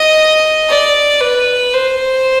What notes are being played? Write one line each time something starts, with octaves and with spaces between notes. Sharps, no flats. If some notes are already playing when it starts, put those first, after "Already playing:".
Already playing: D#5
D5
B4
C5